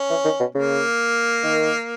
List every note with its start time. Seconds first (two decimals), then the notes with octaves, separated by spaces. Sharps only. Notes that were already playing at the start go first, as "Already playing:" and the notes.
Already playing: C#4
0.10 E3
0.24 D#3
0.39 B2
0.54 C#3 A#3
1.43 D#3